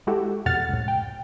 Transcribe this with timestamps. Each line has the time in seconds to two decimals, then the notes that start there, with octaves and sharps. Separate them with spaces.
0.07 G#3 E4 F#4 G4 A4
0.46 F2 B2 F#5 F6 A6
0.69 C#2 A2
0.88 G5